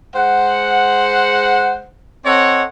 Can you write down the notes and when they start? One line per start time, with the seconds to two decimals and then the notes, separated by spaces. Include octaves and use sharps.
0.16 G#3 C5 F#5
2.26 C4 A4 C#5 D#5 F#5